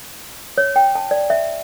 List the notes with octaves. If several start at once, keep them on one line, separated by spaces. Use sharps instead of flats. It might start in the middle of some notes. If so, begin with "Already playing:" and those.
C#5
G5
A5
D5
E5